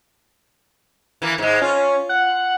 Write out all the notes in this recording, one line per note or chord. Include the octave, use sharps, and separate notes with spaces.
E3 A#3
G#2 G#3
C#4 F4
F#5